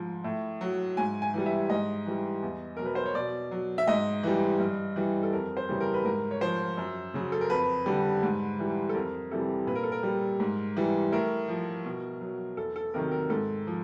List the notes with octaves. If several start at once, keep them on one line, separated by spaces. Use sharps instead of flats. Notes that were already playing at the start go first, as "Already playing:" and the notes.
Already playing: G#2 F3
A2
F#3
G#2 G#5
G#5
E3 G3
E5
G#2 D#5
E3 G3
E2
B2 F#3 A#4
B4
C5
C#5
B2 D5
F#3
E5
G#2 D#5
E3 G3
G2
E3 G3
A4
F2 A#4
C5
C#3 E3 G3
A#4
B4
G#2 A#4
C#5
F3 C5
F#2
C#3 F#3
A4
A#4
F2 B4
D3 G3
G#2
E3 G3
A4
F2 A#4
C3 E3 G3 A4
A#2 B4
A#4
A4
A#4
G3
G#2
E3 G3
A2 A#4
F3
B2
F#3
E2 A4
A4
C3 D#3 F#3 A#4
A#4
G#2 A4
F3